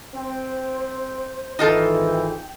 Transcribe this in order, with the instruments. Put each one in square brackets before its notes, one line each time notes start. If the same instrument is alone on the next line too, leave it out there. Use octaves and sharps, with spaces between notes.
[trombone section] C4 [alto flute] C5
[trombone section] G#1 [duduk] E3 [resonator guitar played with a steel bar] D#4 F4 A4 [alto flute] G5